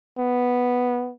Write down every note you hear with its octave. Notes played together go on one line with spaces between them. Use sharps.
B3